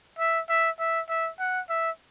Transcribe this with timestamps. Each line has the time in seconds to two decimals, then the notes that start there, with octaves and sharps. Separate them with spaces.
0.19 E5
0.49 E5
0.79 E5
1.09 E5
1.39 F#5
1.69 E5